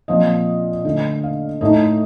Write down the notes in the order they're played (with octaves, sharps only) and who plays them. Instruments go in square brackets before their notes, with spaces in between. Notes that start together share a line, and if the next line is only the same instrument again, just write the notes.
[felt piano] A#2 F3 C4 D#5
D3 A3 D4 D#5
F5
A2 A3 D#4 D#5